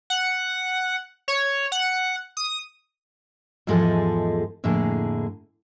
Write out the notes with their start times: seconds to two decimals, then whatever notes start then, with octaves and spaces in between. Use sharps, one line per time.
0.10 F#5
1.28 C#5
1.72 F#5
2.37 D#6
3.67 E2 G#2 F3 G#3 G#4 A4
4.64 F2 A2 D3 A#3 G#4